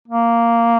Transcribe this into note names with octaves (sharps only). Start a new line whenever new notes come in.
A#3